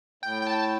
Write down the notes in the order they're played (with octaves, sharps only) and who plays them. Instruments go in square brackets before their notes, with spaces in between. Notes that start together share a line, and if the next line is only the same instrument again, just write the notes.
[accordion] A2 [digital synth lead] G5
[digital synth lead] G5
A5